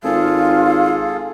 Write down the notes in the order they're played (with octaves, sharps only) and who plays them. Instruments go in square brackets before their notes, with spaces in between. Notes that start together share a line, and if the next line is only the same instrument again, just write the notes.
[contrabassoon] G#1 [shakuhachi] F4 [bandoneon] G#4 A4 [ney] F5